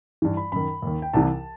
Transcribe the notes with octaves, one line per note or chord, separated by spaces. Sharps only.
G2 E3
B5
F#2 D#3 B5
D#2 D#3
G5
C2 C3 E3 A5